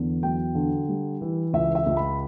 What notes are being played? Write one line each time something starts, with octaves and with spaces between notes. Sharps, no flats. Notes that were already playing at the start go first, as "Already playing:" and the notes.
Already playing: E2 D3
F#3 G5
D3
G3
E3
C#2 E5
E5
C#2
B5